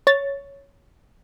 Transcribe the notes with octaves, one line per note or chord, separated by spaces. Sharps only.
C#5 A6